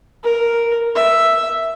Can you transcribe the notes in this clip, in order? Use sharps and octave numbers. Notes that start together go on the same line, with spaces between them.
A#4
E5